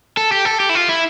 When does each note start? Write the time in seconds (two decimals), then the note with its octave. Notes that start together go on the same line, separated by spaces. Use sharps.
0.17 A4
0.32 G4
0.45 A4
0.60 G4
0.69 E4
0.75 F4
0.89 E4